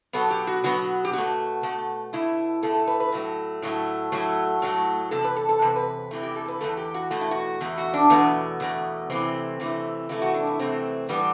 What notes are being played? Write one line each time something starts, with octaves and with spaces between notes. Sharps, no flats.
B2 F#3 B3 A4
G4
F#4
B2 F#3 B3 F#4
G4
B2 A3 F#4
B2 A3
B2 A3 E4
B2 A3 A4
A4
B4
B4
A2 F#3 A3
A2 F#3 A3
A2 F#3 A3
A2 F#3 A3
E2 C3 A4
B4
A4
A4
E2 C3 B4
B4
E2 C3 E3 A3
G4
A4
B4
E2 C3 E3 A3 A4
G4
F#4
E2 B2 A3 F#4
E4
F#4
E2 B2 A3
F#4
D4
E2 B2 A3 B3
E2 B2 A3
C3 E3 A3 C4
C3 E3 A3
C3 E3 A3 E4
F#4
D4
E4
C3 E3 A3 C4
A2 E3 G3 B3